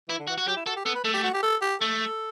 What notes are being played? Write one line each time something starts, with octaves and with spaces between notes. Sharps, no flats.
E3 E4
D3
E3 F#4
F#4
F#3 G4
E4
F#4 A4
G4
B3 A4
B4
A3 A4
G4
F#4
G4
A4
G4
A3 A4